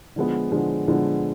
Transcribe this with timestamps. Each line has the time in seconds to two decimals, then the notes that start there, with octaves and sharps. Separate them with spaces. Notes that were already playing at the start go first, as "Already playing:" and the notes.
0.16 D3 F3 G#3 B3
0.52 D3 F3 G#3 B3
0.88 D3 F3 G#3 B3